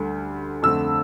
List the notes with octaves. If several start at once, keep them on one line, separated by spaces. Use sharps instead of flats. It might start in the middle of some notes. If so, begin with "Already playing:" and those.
Already playing: D2 D3 G3
F2 D3 A3 E6